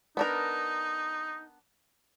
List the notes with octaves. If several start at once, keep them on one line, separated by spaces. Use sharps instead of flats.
B3 D4 D#4 A#4